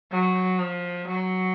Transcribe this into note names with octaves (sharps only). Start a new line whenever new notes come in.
F#3
F3
F#3